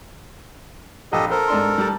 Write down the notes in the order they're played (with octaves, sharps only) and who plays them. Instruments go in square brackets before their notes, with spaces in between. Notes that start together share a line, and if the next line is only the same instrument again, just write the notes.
[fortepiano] A#1 [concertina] G4 A4 D#5
[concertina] A4 A#4 [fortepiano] C5
[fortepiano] G#2 D4 C6
G3 A5